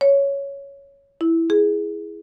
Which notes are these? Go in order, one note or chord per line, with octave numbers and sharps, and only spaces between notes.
C#5
E4
G#4